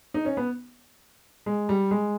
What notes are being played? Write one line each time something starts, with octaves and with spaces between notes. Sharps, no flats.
D#4
C#4
B3
G#3
G3
G#3